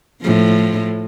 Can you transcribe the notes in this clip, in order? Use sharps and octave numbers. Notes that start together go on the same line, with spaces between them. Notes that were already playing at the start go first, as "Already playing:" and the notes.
A2 F3